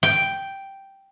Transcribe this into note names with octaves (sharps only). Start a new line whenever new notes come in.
G5